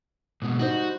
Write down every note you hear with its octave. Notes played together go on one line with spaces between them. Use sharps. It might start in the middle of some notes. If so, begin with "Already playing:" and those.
G#2 B2
G3 D#4 F#4 C5